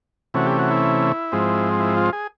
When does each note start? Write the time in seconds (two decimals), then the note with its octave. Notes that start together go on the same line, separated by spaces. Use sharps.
0.34 C3 E3 A3 C#4 F#4
0.46 G4
0.59 F#4
0.71 E4
1.32 G#2 F3 G#3 C4
1.80 E4
1.97 F4
2.13 G#4